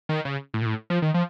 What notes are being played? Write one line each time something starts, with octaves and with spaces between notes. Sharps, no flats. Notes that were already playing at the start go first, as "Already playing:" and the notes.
D#3
C#3
A2
A#2
A2
F3
D#3
F3